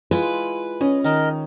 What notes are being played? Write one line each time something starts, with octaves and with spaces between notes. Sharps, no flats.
G#3 E4 F4 B4
C#4 D#5
D#3 D#4 A#4 D#5